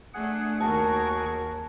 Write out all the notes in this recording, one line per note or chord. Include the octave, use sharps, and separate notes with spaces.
A3 D4 G#4 F#5
D#2 F#4 G#4 A#4 A5 C#6